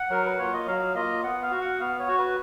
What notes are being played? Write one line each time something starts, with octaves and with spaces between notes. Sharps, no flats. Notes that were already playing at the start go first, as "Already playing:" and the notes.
Already playing: F#5
F#3 A#4
B4
A#3 F4 C#5
D#5
F#3 F5
A#3 F4 D#5
B3 F#5
F5
F#4
F#5
B3 F5
C#5
F#4
B4